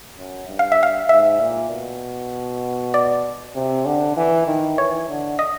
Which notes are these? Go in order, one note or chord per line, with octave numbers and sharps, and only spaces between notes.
F#2
G2
F5
E5
F5
G#2 E5
A#2
B2
D5
C3
D3
E3
D#3
E3 C#5
D3
D#5